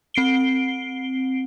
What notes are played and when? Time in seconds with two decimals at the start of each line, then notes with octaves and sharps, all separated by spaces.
0.14 C4 C7 D7 G7